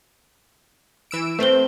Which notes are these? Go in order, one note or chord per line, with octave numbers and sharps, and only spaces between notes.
E3 E6 D7
A3 C4 B4 C5 G7